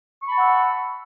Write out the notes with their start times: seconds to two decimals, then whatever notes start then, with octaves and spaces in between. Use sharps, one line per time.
0.22 C#6
0.26 B5
0.30 A5
0.34 F#5
0.38 E6